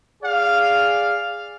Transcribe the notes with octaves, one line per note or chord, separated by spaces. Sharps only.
G#4 D5 F5